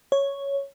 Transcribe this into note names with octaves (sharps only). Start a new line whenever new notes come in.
C#5